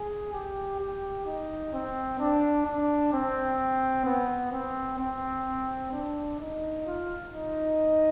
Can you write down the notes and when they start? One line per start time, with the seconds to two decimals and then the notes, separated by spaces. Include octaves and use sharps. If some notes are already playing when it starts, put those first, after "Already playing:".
Already playing: G#4
0.33 G4
0.80 G4
1.26 D#4
1.73 C4
2.19 D4
2.66 D4
3.13 C4
4.06 B3
4.53 C4
4.99 C4
5.92 D4
6.40 D#4
6.87 F4
7.33 D#4